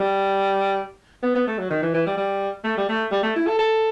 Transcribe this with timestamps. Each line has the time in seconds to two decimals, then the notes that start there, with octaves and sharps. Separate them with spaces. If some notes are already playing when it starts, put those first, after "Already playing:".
Already playing: G3
1.23 B3
1.35 B3
1.47 A3
1.59 F#3
1.71 D#3
1.83 E3
1.94 E3
2.07 G3
2.17 G3
2.64 A3
2.78 G3
2.89 A3
3.12 G3
3.23 A3
3.36 E4
3.47 A4
3.59 A4